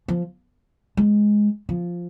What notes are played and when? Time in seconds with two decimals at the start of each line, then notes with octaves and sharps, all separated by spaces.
0.08 F3
0.97 G#3
1.69 F3